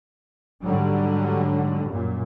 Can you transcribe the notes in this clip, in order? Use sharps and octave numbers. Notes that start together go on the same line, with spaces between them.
G#2 D3 F#3 G3
F#2 A#2